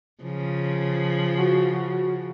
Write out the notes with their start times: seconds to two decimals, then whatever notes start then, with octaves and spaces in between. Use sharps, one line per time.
0.23 C#3 F3
1.38 F#4